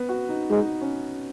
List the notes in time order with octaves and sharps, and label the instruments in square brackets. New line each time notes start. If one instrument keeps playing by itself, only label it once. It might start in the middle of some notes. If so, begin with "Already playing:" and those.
Already playing: [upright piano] B3
F#4
D#4
[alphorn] G#3 [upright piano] D#4
[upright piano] C#4